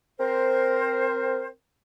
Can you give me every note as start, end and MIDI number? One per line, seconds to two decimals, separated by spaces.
0.19 1.46 60
0.19 1.46 70
0.19 1.46 72